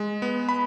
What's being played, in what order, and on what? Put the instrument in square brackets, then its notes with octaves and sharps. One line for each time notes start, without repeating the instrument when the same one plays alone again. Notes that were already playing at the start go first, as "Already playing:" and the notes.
Already playing: [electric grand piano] G#3
B3
B5